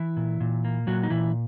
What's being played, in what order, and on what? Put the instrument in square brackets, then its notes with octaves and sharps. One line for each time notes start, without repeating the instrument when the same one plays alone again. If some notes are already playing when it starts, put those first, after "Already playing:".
Already playing: [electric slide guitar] E3 E4
A#2
A#2
A#3
A#2 F#3 F#4
D#4
A#2 E3 E4